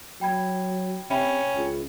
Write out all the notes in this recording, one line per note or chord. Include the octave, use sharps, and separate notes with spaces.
F#3 G5 B5 G#6
C3 C#4 E5 G5 B5
C#2